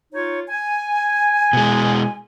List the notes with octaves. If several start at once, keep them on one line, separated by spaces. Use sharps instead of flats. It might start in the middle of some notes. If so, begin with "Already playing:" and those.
D#4 F4 C#5
G#5
B2 G#3